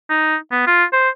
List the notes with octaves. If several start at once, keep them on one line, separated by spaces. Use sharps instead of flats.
D#4
B3
F4
C5